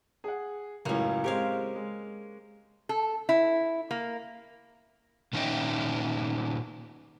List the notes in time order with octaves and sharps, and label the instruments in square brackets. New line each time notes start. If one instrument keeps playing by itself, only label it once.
[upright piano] G#4 F#5
[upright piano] C#2 F#2 A2 [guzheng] A#3 C#4
[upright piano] G#3 C4 G4 [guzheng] A#4 C#5 F5
[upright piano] G#3
[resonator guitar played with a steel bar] A4
E4
A#3
[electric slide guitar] A#2 D#3 C#4 E4 D#5 G5